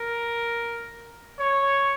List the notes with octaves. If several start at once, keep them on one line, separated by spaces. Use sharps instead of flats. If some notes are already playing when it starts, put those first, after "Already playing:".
Already playing: A#4
C#5